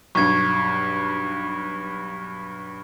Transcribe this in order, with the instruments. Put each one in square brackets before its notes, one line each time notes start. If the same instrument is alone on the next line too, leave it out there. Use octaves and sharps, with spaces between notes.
[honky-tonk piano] B1 G2 [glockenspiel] C#6 G#6